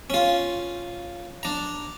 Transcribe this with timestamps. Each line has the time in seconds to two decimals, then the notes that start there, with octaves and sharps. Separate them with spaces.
0.10 C#4 F4
1.43 D4 A#5